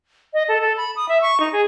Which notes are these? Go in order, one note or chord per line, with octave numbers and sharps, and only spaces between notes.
D#5
A4
A4
B5
D#6
E5
C#6
D#4
G#4